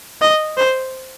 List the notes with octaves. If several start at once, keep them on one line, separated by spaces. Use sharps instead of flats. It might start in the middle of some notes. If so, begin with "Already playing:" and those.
D#5
C5